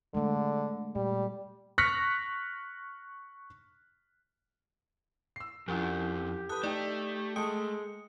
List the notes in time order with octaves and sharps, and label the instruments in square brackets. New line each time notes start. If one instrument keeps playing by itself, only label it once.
[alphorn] D3 [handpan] G#3 A3
[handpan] A#2 [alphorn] G3
[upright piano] C#6 F6 F#6 A#6 B6 C#7
[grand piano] E6 C7
[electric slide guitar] F2 [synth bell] F3 C#4 E4 [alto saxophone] G4
[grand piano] A4 B4 [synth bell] D#6 F#6
[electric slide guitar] A3 [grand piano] D#4 G5 [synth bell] D5
[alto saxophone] G#3 [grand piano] A4 G5 [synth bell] D#6 C#7